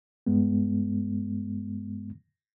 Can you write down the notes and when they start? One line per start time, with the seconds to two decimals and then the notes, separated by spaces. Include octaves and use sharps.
0.26 G2 G#3 B3